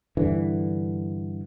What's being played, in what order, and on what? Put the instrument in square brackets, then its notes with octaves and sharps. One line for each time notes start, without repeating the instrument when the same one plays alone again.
[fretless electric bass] G2 D3 E3